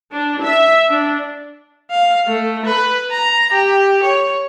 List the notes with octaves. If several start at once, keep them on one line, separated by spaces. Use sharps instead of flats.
D4
E5
D4
F5
A3
B4
A#5
G4
C#5